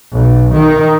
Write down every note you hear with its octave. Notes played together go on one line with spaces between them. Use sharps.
B1
D#3